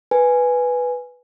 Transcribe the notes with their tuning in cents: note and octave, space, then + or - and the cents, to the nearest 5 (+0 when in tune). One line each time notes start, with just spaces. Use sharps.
B4 +0 G#5 +0